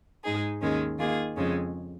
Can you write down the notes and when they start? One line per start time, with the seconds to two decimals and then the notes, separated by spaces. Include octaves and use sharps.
0.24 G#2 G#3 D#4 G#4
0.62 D#2 D#3 G#3 C#4
0.99 D#3 A#3 F4 G#4
1.36 F2 C#3 G#3 C#4